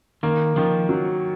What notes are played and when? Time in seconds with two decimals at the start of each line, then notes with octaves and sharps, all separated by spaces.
0.23 D#3 A#3
0.56 D#3 F3
0.89 F#3